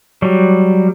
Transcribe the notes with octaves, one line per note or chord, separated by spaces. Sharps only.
F#3 G3